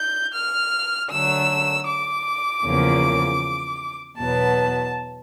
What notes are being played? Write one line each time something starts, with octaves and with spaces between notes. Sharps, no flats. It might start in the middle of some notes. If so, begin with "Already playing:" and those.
Already playing: G6
F6
D3 F#3 A3 E6
D6
E2 C#3 F3 A#3 C#4
E2 B2 F#3 B3 A5